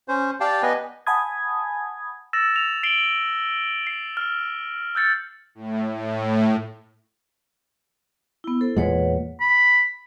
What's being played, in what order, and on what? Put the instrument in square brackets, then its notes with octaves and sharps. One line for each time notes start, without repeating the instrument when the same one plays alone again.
[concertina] C#4 C5
G4 D5 F5 G5 A5
B3 B4 D#5 G#5
[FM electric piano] F#5 G#5 A5 B5 D#6 G#6
[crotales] E6 A6 A#6 E7
F7
C7 D7 F#7 G7
C7
F6 C7
E6 G6 A6 C#7
[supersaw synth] A2
A2
[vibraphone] B3 E4
E4 A4 C5
[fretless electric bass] E2 A#2 G#3 [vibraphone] B4 C#5 F#5
[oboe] B5